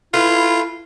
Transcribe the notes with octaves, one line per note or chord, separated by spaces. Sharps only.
A3 E4 F4 B4